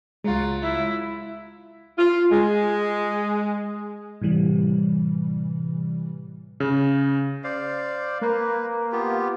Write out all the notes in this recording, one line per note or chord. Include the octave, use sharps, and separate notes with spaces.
C#2 F#3 G#3 F4
E4
F4
G#3
A2 C3 E3 G3
C#3
C5 D5 F5
A#3 B4
B3 F4 G4